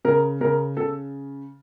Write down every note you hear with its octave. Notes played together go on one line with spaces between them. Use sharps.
C#3 A#4
C#3 A#4
C#3 A4